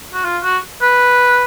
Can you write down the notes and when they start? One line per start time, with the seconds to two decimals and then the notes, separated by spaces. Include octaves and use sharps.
0.14 F#4
0.24 F4
0.43 F#4
0.82 B4